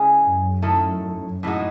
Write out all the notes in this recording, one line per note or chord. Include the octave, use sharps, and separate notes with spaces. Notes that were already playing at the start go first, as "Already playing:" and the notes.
Already playing: C#3 G#3 C#4 E4 G#4
F#2
D#3 A3 E4 A4
A2 E3 G#3 D#4 F#4